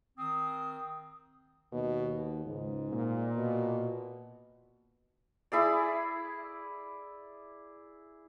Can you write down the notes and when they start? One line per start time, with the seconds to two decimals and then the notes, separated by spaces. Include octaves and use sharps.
0.18 D#3 C4 D#6
1.72 D#2 B2
2.45 C#2 G#2
2.92 A#2
3.37 B2
5.52 E4 G#4 D5